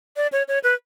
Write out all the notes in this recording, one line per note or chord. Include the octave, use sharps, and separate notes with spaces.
D5
C#5
C#5
B4